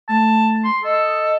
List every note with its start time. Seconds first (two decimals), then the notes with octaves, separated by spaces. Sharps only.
0.09 A3 A5
0.64 C6
0.84 A4 D#5